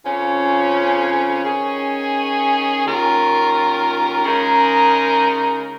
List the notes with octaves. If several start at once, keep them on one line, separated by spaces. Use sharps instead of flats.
F2 C#3 F3 C#4
D#3 C#4 G#4
D#2 D#3 C#4 F4 A#4
C#3 G#3 D#4 A#4